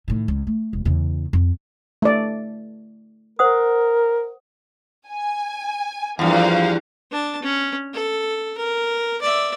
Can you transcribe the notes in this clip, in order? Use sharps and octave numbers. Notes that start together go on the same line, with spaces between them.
A2 D#3
C#2
A3
E1
E2 C#3
F2
A3 D5
A#4 C5 F#5 D#6
G#5
E2 G2 F3 A#3 F5
D4 A5
C#4
A4
A#4
D5 E5